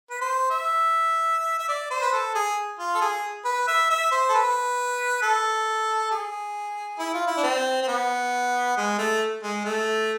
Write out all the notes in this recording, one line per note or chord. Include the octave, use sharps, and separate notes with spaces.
B4
C5
E5
E5
D5
C5
B4
A4
G#4
F4
A4
G#4
B4
E5
E5
C5
A4
B4
A4
G#4
E4
F4
E4
D4
C4
C4
B3
G#3
A3
G#3
A3